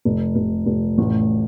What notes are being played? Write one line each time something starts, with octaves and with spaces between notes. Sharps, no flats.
F1
F1
F1
A1